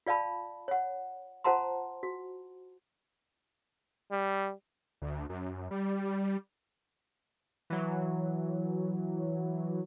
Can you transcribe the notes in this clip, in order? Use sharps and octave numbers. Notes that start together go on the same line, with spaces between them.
F4 D5 F5 A5 B5
C#5 F#5
F4 C5 F#5 A5 A#5 C6
F#4
G3
D2
F#2
G3
E3 F#3